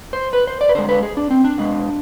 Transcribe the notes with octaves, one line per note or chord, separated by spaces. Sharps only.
C5
B4
C5
D5
B4
D3 G#3 C5
B4
G#4
D4
C4
D4
B2 G#3